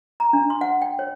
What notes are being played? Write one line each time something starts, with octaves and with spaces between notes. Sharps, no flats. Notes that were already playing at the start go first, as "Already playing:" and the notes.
A#5
D4
C6
F#5
G5
C#5